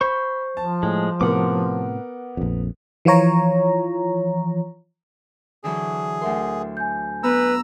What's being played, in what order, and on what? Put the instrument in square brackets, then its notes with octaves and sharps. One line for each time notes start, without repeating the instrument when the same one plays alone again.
[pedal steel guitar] C5 C#6 [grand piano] B5
[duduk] F3 [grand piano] A5
[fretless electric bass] A2 [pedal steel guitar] G#3
[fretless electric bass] A2 C3 [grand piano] B3 A#4 [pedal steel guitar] F#5 D6
[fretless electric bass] A#1 F2
[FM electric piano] E3 F3 F4 C#5 A#5
[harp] D3 E3 F#3 [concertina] G#4
[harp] D2 C6 [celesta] A#4 E5 F#5
[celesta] G#5 G6
[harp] B3 [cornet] B4 [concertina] A#5 E6